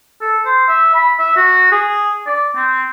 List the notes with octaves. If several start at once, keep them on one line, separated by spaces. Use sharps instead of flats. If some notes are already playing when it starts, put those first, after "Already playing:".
A4
C5
E5
B5
E5
F#4
G#4
D5
C4